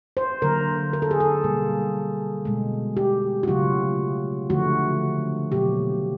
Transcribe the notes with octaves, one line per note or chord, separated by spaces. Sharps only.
C5
D3 F#3 A#3 A#4
A#4
A4
G#4
A4
B2 G3 A#3
B2 G#3
G4
F#4
C#3 F#3 A3 F4
D3 F3 A3 F#4
B2 F#3 A#3 G4